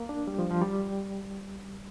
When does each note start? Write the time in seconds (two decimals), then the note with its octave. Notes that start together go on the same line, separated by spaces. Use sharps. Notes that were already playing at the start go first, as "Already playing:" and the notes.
Already playing: A#3
0.09 D4
0.27 G3
0.39 F3
0.51 F3
0.62 G3